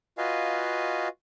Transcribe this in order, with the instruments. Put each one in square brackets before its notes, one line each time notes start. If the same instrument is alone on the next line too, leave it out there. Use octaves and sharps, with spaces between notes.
[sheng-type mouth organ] F4 F#4 B4 D#5 F5 G#5